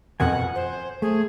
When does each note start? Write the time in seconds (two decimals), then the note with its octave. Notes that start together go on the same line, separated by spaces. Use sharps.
0.20 F2 B2 D#3 F#5 G#5
0.55 C5
1.02 A3 G#4